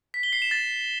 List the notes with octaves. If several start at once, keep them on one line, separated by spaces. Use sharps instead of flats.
B6
G7
C7
E7
A6